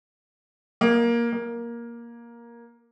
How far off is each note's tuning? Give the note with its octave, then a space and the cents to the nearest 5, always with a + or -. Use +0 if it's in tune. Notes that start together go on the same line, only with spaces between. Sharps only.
A#3 +10
A#3 +10